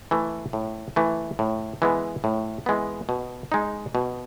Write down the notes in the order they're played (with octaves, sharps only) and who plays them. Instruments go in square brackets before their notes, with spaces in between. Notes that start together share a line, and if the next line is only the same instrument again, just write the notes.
[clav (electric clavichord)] E3 A3
A2
E3 A3
A2
E3 G#3 B3
A2
E3 G#3 B3
B2
G#3 D#4
B2